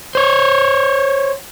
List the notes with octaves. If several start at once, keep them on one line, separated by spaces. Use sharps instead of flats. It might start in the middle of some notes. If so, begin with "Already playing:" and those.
C5 C#5